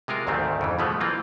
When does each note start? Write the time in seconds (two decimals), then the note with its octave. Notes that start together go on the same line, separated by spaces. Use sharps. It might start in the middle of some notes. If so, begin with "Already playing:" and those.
0.08 C3 G#3 F4 A#4
0.27 D2 G#2 D#3 A3 C4
0.61 F2 C#3 E3
0.79 B2 F3 G#3 A3 B3
1.01 E3 A#3 C4 F4